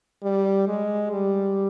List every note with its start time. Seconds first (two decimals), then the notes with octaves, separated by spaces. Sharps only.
0.22 G3
0.67 G#3
1.12 G3